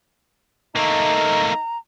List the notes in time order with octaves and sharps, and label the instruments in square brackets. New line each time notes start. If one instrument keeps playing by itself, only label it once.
[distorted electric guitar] A3 A#3 [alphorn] D#4 [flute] A#5